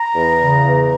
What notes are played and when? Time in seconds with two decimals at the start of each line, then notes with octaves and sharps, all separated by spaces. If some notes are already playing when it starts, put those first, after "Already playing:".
Already playing: A#5
0.13 E2
0.39 C#3
0.63 E2